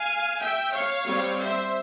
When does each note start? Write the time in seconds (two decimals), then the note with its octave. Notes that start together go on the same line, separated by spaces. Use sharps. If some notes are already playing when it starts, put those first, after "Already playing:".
Already playing: F5 G#5
0.40 E5 G5
0.74 C#5 F5
1.07 G3 C4
1.40 C5 E5